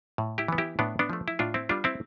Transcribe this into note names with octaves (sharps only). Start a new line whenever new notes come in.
A2
E4 G4
E3 B3
E4 G4
A2 B3 D4
B3 D4
F3 A3
E4
A2 D4 F4
C4 E4
G3 B3 D4 F4
C4 E4